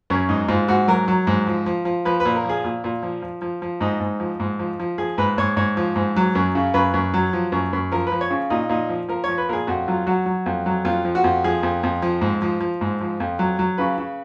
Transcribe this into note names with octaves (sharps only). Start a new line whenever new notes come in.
F#2 C#4
G#2 D#4
G#2 F4
G#2 F#4
F#3 A#4
F#3
G#2
F3
F3
F3
F3 B4
B4
A#2
A#4
F3 G#4
A#2
A#2
F3
F3
F3
F3
G#2 D#4
G#2
F3
G#2
F3
F3
F3 G#4
G#2 B4
G#2 C#5
G#2 C#5
F3
G#2
F#3
F#2
C#3
F#2 B4
F#2
F#3
F3
F#2
F#2
F3 A#4
B4
F3
C#5
C#3
A#2 D#4
A#2 D#4
F3
F3 A#4
F3 C#5
B4
A#2 G#4 A#4
F2 F#4
F#3 F4
F#3 F#4
F#3
F2
F#3
F2 F4
F3
F#4
F2
F3 G#4
F2
F2
F3
G#2
F3
F3
G#2
F3
F2
F#3
F#3
C#3 B4
C#3